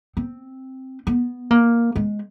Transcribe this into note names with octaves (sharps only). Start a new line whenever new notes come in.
C4
B3
A#3
G#3